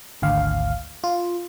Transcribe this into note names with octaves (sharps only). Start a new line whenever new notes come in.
G#1 D2 F5
F4